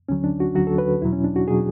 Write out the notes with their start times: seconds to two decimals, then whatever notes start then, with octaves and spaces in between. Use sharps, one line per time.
0.09 D2 D3 F#3 C#4
0.24 D4
0.40 F#4
0.55 D2 D3 F#3 F#4
0.67 A4
0.78 B4
1.01 E2 B2 F#3 E4
1.13 C#4
1.24 D4
1.36 F#4
1.48 B2 F#3 G#4